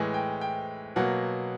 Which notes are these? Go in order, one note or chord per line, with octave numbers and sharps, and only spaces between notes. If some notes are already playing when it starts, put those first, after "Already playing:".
Already playing: A2 E3 G#3
G5
G5
B2 F#3 A#3 F#5